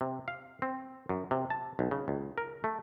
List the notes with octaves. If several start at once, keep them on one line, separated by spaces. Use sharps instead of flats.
C3
F5
C4
F#2
C3
A5
B1
C#3
C#2
A#4
A3